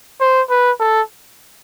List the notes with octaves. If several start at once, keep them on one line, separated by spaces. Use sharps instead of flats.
C5
B4
A4